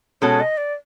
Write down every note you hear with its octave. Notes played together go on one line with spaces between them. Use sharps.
B2 G#3 C#4 F#4 A4 C#5
D#5
D5